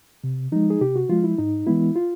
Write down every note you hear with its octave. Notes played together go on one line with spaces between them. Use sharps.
C3
F3 G#3 D#4
G#4
C3 G4
F#4
F3 G#3 F4
E4
G#2 D#4
E3 G#3 B3 E4
F4